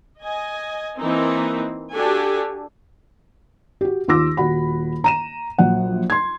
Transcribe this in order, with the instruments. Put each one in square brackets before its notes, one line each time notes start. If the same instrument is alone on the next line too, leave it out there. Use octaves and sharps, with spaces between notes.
[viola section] D#5 G#5
E3 A#3 C4 D#4
D4 F#4 G4 A4 G#5
[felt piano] F#4 G4
D#2 F4 C6 D6 E6 A#6
D#1 F#4 F#5 B5
A#5 D#7 E7
A#1 F#3 F#5
C6 G#6